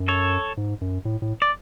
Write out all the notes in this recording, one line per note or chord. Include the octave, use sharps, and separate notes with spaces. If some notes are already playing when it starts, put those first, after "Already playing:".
Already playing: F#2
A4 C#5
G#2
F#2
A2
A2
D5